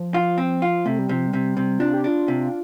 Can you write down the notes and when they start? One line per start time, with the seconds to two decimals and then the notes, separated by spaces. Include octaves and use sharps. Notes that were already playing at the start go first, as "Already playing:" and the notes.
Already playing: F3
0.14 F4
0.38 C4
0.62 F4
0.85 C3 A3
0.99 G3
1.09 C3 F3
1.27 G3
1.33 C3
1.57 C3
1.79 D4 F4
1.93 G4
2.04 D4 F4
2.28 C3